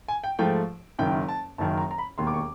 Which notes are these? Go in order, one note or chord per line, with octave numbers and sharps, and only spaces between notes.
G#5
G5
G#2 F3 A3 G5
F#1 F#2 D#3 G5
A5
F#1 F#2 D#3 A5
A#5
A#5
B5
E1 D#2 D#3 C6
D6
C#6